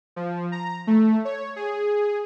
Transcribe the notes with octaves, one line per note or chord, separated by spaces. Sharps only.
F3
A#5
A3
C#5
G#4